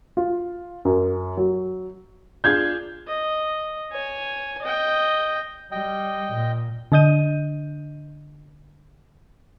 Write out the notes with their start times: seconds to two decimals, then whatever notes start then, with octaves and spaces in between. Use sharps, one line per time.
0.17 F4
0.85 F#2
1.37 F#3
2.44 D4 F4 G#4 G6 G#6
3.07 D#5
3.92 C#5 G#5
4.62 D#5 G5
5.72 G3 D#5 G5
6.33 A#2
6.92 D3 D4 D#5 G6 D#7